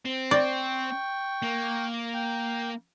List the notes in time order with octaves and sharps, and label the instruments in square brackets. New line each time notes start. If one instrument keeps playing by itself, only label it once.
[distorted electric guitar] C4
[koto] D5 [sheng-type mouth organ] G5 C#6
[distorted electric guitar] A#3
[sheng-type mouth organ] G5